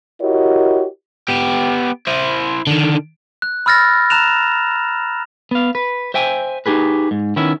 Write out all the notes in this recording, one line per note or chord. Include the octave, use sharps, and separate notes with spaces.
E4 F#4 G4 A#4 C#5 D#5
B3 G4
E4 C5
D3 D#3
F#6
B5 E6 F6 A6 A#6
A#5 F#6 E7 F7
B3 F5
B4
C5 E5 G5 G#5
D#4 G4 G#4 B4
G#2
D#3 B3 C#4 E4